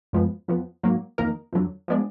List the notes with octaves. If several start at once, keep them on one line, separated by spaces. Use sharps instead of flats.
F#2 F3 G#3 B3
F2 F3 B3
G#2 F#3 A#3
F2 D#3 A#3 D#4 A#4
F2 D3 F#3
F3 G#3 B3 D4